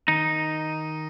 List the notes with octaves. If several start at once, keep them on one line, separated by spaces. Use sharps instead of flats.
D#3 D#4